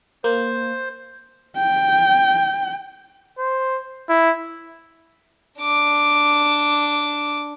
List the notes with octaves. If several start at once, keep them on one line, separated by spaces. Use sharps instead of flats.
A#3 C5
G5
C5
E4
D4 D6